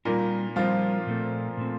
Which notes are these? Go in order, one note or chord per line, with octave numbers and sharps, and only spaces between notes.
A#2 G3 A#3 C4 D#4 A#4
F3 G3 C4 D#4 F4 A#4
A#2 A3 C4
A#2 A3 C4